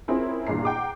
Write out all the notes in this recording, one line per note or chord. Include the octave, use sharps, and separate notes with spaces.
C4 C#4 E4 F4 G#4 A#4
E2 G2 A#2 A#5 C7
F#5 G5 A#5 D6